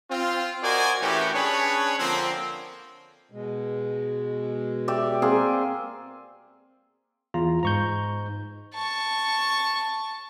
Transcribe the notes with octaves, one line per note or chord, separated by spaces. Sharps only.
C4 F4
F#4 A#4 C5 D5 D#5 G#5
A2 E3 C#4 F#4 G4
C#4 D4 G#4 B4 C#5
D3 F3 A#3 C4
B2 G#3
G4 D5 E5
A#3 C4 G#4
E2 F4 A#5
G#2 A#5 C#6 G6
A5 C#6